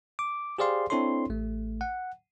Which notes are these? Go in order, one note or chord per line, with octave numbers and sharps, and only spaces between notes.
D6
G4 G#4 C5 D5 F5 C6
C4 D4 E4 A4 C#5 C6
A1 A3
F#5